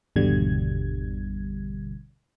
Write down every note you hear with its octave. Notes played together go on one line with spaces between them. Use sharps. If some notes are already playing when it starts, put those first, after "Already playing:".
G#1 E2 B2 D3 G3 G#6